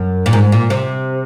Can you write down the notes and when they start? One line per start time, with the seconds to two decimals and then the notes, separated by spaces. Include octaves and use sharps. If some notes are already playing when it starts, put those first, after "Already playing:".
Already playing: F#2
0.26 A#2
0.33 G#2
0.52 A#2
0.70 C3